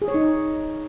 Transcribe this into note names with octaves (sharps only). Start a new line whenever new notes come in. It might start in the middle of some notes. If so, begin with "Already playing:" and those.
G#4
C#5
D#4